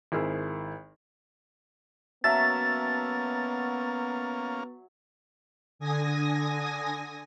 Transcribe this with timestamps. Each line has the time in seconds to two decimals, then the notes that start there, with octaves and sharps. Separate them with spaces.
0.12 G#1 E4 G#4 A#4 C5 E6
2.24 F#3 A#3 B3 C#4 E5 F5 A5 A6
5.79 D3 G#5 D#6 A#6